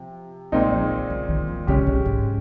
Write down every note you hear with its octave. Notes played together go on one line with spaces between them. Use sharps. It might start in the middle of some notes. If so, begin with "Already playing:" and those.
Already playing: C3 F3
A#2 G3 G#3 C4 D#4
F3
D#3
C#3
D#3
F3
C#3 G#3 C#4 G4
C3
G#2